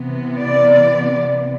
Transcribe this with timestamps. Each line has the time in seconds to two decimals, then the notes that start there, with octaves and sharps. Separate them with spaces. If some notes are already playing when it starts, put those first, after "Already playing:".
Already playing: C3 E3 B3
0.37 D5